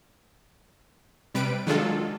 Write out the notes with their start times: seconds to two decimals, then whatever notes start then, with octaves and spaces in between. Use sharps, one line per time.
1.35 C3 G3 B4 D7
1.66 D#3 F#3 G#3 D4 F4 A4